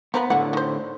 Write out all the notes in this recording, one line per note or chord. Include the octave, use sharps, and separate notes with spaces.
F3 B3 A#4 B4
A2 D3 F3 F#5
D#3 C5